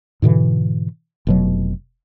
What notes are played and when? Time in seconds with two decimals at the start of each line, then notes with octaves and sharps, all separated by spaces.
0.22 G#2 B2 D3 E3
1.27 F1 B2 F#3